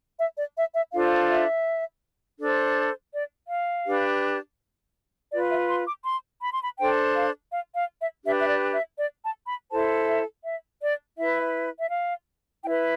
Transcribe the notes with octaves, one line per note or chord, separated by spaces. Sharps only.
E5
D5
E5
E5
D4 F4 A4 C5 F5
E5
D4 A4 C5
D5
F5
D4 G4 B4
F4 B4 D5
E5
C6
D6
C6
B5
C6
B5
D4 A4 C5 G5
F5
F5
F5
E5
D4 G4 B4 E5
E5
D5
E5
D5
A5
B5
E4 A4 C5 A5
E5
E5
D5
E4 B4 E5
E5
F5
E4 G5
B4